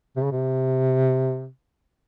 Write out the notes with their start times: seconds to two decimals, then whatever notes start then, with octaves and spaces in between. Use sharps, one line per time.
0.16 C3
0.24 C#3
0.32 C3